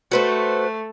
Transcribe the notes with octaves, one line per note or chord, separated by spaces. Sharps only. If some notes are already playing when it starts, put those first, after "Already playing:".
A3 F#4 B4 C5